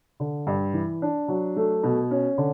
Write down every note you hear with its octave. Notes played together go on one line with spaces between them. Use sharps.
D3
G2
E3
D4
F#3
A3
B2
C#4
D3